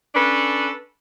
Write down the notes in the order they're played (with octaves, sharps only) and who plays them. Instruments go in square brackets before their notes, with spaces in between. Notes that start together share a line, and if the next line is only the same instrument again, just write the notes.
[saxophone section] C#4 D4 A4 B4